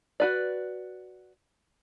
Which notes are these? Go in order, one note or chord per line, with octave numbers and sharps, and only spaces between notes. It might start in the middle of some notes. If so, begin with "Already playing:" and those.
F#4 B4 D5